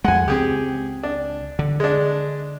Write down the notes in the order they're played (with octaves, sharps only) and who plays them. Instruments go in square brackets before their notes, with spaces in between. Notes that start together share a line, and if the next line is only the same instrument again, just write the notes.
[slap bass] F2 G#3 [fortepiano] F#5 G#5
[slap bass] C#2 C4 [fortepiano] G4 G#4
[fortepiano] D4
[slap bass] D3
[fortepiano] G#3 D4